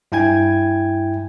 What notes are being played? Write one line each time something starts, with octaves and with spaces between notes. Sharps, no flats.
G2 E4 G5 G#5 G#6